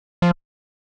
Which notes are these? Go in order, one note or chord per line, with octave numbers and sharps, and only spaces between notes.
F3